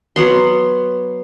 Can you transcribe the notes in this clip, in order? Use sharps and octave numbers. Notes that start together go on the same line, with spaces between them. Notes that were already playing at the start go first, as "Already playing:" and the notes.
F#3 B3 C6